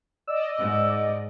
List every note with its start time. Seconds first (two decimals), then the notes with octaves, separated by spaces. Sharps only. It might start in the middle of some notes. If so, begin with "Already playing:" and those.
0.27 D5 D#5 E6
0.58 G#2